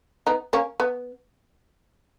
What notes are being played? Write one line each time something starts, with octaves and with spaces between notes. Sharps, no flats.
B3 D#4
A#3 C#4
B3